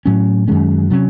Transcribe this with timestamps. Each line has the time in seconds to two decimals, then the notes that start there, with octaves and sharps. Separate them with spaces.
0.06 A2 F#3 C#4
0.48 F#2 D#3 G#3 C#4
0.90 C3 F#3 C#4